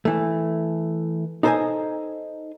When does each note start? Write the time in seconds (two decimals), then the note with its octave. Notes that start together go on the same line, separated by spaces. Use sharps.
0.05 E3 A3
1.43 D#4 A4 C5 D5 D#5 G#5